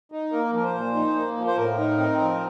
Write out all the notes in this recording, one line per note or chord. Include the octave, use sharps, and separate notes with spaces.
D#4
A#3 A#4
F3 A#4
C5
A#2
D#4
A#3
F3
C5
A2 A#4
D#4
C4
F3